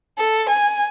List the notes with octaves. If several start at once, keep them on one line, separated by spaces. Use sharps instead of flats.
A4
G#5